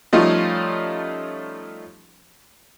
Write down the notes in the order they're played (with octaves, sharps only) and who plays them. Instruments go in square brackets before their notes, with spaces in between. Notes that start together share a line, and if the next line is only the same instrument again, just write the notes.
[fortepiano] F3 G3 A3 C#4 D#4 F4